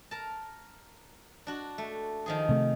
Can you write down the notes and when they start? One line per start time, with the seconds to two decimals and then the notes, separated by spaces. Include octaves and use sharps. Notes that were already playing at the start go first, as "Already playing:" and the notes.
0.11 A#4 A5
1.47 D4 F#4
1.78 A3
2.26 D#3 F3 G#4
2.49 C3 A3